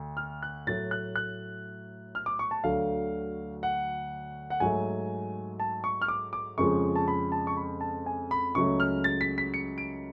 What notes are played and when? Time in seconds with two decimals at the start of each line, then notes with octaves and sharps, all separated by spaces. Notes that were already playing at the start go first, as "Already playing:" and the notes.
Already playing: D2
0.17 F6
0.43 F#6
0.67 A2 F#3 A3 A6
0.91 F#6
1.16 F#6
2.15 F6
2.26 D6
2.39 C#6
2.51 A5
2.64 D2 D3 F#3 A3 F5
3.63 F#5
4.50 F#5
4.60 G#2 F#3 A3 G#5
5.60 A5
5.84 C#6
6.02 F6
6.08 D6
6.33 D6
6.58 F2 C#3 F3 G#3 C#6
6.96 A5
7.08 B5
7.32 A5
7.47 C#6
7.57 B5
7.81 A5
8.06 G#5
8.31 B5
8.55 C#2 C#3 F#3 A3 C#6
8.80 F6
9.04 A6
9.21 B6
9.38 B6
9.54 C#7
9.78 D7